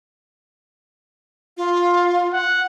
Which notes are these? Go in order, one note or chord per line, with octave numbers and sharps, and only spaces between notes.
F4
F#5